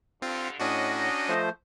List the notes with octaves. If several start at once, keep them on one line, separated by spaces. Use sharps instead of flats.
G2 D3 C4 F4
A2 C#4 D4 F#4 D#5 F#5
D#2 D#4 D#5
F3 A3 C5